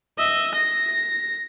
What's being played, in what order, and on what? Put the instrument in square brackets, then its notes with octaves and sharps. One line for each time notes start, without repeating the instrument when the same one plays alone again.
[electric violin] D#5 E5
A#6